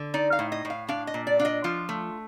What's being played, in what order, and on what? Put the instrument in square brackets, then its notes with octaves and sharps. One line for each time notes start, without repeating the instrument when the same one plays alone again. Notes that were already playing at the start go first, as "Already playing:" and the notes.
Already playing: [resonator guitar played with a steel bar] D3
D#4 D5
F5
A2
D#5
A2
F5
D4 F5
D#5
A#2
D5
D4 F5
D#5
F3 F4
A3